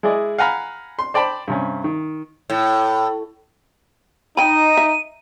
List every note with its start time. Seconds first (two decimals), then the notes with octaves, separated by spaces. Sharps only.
0.03 G#3 E4 G#4 D5 D#5
0.38 F5 F#5 G#5 A#5 B5 F6
0.99 C6
1.14 C5 D5 G5 A5 B5
1.48 G2 C3 C#4
1.84 D#3
2.50 A2
4.37 D#3 D#4 G5 B5 D#7
4.77 E5